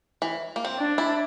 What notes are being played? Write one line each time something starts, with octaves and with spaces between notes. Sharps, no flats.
E3
A#3
C4
D4
E4